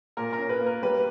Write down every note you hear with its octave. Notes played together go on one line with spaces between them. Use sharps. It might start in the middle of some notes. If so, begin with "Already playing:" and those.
A#2 A#4
A#4
C#4
B4
A#3
A#4
G3 B4